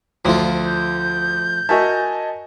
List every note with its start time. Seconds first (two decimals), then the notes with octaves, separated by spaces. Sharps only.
0.25 D2 F3 A3 F4
0.66 G6
1.69 F#4 A#4 D#5 E5 G#5 A5